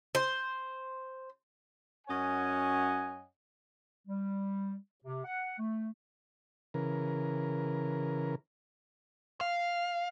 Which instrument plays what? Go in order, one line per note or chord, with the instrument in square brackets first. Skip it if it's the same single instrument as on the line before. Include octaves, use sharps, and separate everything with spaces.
[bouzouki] C5
[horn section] F#2 C#4 C#5 D#5 F#5 G#5
[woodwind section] G3
C3
F#5
A3
[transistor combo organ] C#3 E3 A#4
[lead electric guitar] F5